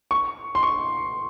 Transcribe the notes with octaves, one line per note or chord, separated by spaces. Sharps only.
C#6
C6
C#6